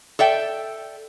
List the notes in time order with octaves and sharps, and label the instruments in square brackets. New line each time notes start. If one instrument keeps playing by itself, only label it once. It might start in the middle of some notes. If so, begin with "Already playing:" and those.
[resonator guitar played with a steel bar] A4 D5 E5 G5